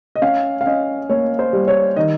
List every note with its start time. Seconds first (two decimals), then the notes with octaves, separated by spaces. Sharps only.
0.15 D#5
0.22 C#4 F5
0.61 F5
0.66 C#4 D#5
1.09 A#3 C#5
1.39 C5
1.53 G3
1.68 C#5
1.96 D#3 D#5